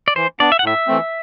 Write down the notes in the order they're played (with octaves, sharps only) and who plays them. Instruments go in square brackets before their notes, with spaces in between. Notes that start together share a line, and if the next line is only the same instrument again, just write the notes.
[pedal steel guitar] D5
[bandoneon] E3 [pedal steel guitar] C5
[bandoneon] B3 D4 [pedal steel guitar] D5
[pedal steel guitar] E5
F#5
[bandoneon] A2 [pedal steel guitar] E5
[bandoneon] E3 A3 C4